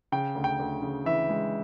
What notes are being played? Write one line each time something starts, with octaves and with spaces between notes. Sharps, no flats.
C#3 G5
D2
G5
D2
C#3
E3 E5
G#3